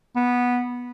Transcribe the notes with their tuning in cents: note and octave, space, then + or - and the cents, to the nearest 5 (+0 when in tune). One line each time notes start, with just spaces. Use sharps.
B3 -10